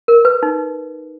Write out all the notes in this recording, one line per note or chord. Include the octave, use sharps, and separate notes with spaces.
A#4
B4
D#4